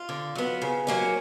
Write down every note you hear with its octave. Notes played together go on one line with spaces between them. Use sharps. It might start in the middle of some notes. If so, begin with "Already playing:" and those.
Already playing: F4
D3
F#3 B3
C#3
F#3 A#3 C#4